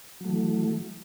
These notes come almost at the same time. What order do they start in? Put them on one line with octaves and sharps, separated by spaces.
F#3 A3 E3